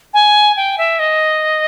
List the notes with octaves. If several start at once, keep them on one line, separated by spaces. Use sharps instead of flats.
G#5
G5
E5
D#5